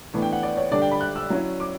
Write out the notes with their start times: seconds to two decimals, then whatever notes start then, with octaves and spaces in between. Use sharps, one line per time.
0.14 A2 E3 B3 D4
0.22 G5
0.33 F#5
0.43 D5
0.57 C#5
0.71 D3 G3 D4 D5
0.82 G5
0.91 B5
1.01 F#6
1.16 E6
1.30 F#3 C#4 E4
1.60 D6